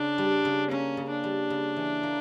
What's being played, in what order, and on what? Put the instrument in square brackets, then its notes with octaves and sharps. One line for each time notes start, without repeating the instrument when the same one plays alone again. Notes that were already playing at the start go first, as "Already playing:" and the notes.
Already playing: [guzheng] C#3 [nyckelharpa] D4
[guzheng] G3
C#3
[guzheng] A#3 [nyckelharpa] C#4
[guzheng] C#3
[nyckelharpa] D4
[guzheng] G3
C#3
E3
A#3